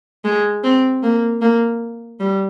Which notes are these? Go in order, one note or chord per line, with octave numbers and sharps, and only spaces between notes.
G#3
C4
A#3
A#3
G3